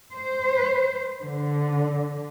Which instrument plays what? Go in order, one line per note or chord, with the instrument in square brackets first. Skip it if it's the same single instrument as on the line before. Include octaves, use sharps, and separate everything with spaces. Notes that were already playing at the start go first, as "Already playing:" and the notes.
[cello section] C5
D3